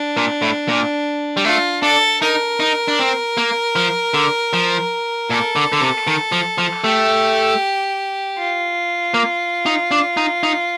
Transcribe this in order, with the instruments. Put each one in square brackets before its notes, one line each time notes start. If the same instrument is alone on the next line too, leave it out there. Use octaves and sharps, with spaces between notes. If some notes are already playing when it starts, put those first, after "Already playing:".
Already playing: [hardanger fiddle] D4
[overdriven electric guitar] A#2
A2
A#2
G3
[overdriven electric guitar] A3 [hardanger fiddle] F4
[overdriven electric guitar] D4 [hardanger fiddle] A4
[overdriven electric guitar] D#4 [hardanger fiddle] A#4
[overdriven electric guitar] D#4
D4
C4
A#3
F3
D3
F3
[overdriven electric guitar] A#2 [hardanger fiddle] A4
[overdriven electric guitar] D3
D3
C3
D#3
F3
F3
[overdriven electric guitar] A3 [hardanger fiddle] G4
[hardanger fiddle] F4
[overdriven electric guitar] A#3
D#4
D4
D#4
D#4